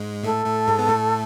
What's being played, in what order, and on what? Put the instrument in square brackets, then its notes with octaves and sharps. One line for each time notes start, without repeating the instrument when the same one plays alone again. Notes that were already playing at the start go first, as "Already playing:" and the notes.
Already playing: [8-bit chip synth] G#2 G#3
[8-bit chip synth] A2 A3 [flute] A4
[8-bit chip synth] A2 A3
G#2 G#3
B3
A2 A3